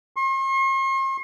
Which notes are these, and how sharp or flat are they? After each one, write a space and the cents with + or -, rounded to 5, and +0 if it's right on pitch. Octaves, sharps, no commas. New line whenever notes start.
C6 +45